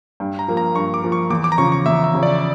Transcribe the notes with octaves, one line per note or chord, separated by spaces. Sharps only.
G2
A#5
F3 A#3
A#5
G2 C#6
D6
F3 A#3
C#6
E2 D6
D6
A#5
C#3 F3 C#4 C#6
C#6
E2 E5
E5
C#3 F3 C#4
D5